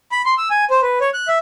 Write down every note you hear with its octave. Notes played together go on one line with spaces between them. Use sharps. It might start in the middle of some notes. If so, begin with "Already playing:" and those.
B5
C6
E6
G#5
C5
B4
C#5
F#6
E5